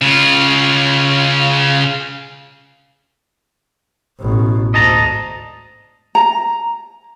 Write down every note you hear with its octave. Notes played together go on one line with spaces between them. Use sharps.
C#3 F4
A1 B2
D2 G#2 D#5 A5 A#5
A#5